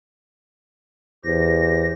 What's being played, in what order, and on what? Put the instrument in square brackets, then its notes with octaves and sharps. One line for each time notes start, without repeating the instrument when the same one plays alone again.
[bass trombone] E2 [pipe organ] G4 C5 A#6